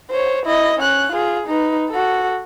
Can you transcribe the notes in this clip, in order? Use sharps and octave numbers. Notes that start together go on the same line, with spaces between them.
C5 C#5
E4 D#5
C#4 F#6
F4 G#4
D#4 B4
F#4 A4